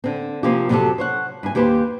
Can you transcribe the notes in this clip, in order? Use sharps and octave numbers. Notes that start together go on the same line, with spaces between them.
D3 C4
C3 F3 A#3 C#4 G4
F2 C3 F#3 D#4 G4 A4
C5 C#5 F#5
G2 G#5
D#2 G4 B4 C5